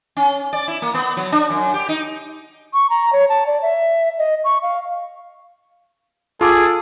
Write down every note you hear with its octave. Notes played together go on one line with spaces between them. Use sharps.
C#4
D5
E4
A#3
B3
F#3
D4
F#2
G4
D#4
C#6
A#5
C#5
A5
D5
E5
D#5
C#6
F5
F4 G#4 A4 D6